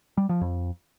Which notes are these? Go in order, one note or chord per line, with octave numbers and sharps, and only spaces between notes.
G3
F3
F2